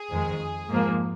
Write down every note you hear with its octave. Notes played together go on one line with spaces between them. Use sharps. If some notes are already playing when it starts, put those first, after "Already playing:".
Already playing: G#4
F2 D#3 G#3
G#2 F3 A#3